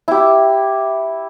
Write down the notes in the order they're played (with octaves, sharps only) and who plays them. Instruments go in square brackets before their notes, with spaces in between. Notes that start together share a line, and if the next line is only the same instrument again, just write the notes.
[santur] E4 G4